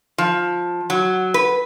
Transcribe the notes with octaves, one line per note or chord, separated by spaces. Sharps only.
F3
F#3
B4